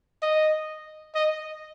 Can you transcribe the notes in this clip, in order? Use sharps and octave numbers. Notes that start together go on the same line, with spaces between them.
D#5
D#5